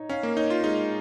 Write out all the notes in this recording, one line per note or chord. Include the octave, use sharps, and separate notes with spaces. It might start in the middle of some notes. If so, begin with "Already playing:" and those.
Already playing: D#4 C#5
C#4 F5
A#3
D#4 C#5
F4
G#3 D#4